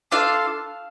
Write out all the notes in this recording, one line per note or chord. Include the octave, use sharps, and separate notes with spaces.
D4 F4 A4 F5